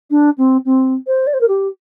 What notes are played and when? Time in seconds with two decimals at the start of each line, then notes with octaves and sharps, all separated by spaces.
0.11 D4
0.38 C4
0.65 C4
1.07 C5
1.27 D5
1.34 C5
1.41 A#4
1.48 G4